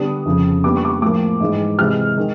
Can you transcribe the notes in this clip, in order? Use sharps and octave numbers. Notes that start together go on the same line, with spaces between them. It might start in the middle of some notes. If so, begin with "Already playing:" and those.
Already playing: D3 G3 B3 D4 D#6
F2 C#3 F3
A#2 G3 B3 D4 D6
C#6
D6
C#6
A2 F3 A#3 D6
G#2 E3 G#3
C3 E3 G#3 C4 F6
D#3 G#3